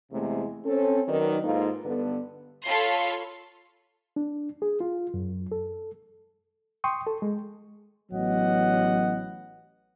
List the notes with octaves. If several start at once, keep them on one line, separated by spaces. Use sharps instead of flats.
E2 C3 G#3 A3
C4 C#4 A4
D#3 F#3 D#4 A#4 B4 D5
G#2 A#3 D#4 F4 A4 B4
G2 D3 B3 A4 B4
F4 A4 C#5 F5 B5 C6
D4
G#4
F4
F#2
A4
G5 C6 C#6 D#6
A4
G#3
A1 F#3 B3 D#5 F#5